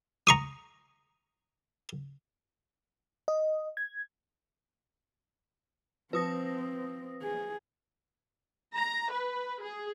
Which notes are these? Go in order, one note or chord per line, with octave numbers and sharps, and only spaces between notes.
A#5 C#6 D#6
D#5
G#6
F3 C4 B4 D#6 A#6
G#4
A#5
B4
G#4